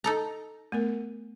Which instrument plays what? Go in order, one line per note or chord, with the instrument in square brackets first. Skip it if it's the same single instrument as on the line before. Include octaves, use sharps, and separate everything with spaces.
[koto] D#4 A4 A#5
[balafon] A3 B3 A#4